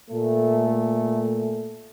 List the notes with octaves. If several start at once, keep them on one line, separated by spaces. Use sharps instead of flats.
A#2 A3